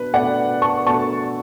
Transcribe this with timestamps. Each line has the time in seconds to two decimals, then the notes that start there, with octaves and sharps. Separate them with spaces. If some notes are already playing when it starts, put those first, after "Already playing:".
Already playing: B2 D4 B4
0.14 B2 A3 D4 D5 F#5
0.62 A5 C#6
0.86 B2 A3 D4 A5 C#6